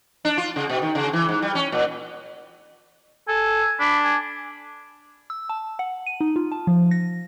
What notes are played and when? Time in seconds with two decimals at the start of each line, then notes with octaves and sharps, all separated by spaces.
0.25 D4
0.38 F4
0.56 C#3
0.70 B2
0.82 D#3
0.95 C#3
1.13 E3
1.29 G#2
1.42 G3
1.55 C#4
1.72 A#2
3.28 A4 G#5
3.80 D4 B5
4.05 G#5
5.30 E6
5.49 A5
5.79 F#5
6.07 D#7
6.21 D#4
6.36 F4
6.52 A5
6.67 F3
6.91 A#6